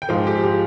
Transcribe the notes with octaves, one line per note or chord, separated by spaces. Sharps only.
G5
G#2 F3 G#3 F5
G4
G4